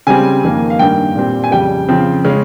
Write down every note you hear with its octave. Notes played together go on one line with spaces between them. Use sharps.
C#3 G3 C4 G#5
F2 D#3 A#3
F5
G2 D#3 A#3 G5
A#2 G3 C4
G#5
F2 C#3 G3 G5
C#3 F3 C4
C#3 G#3 C#4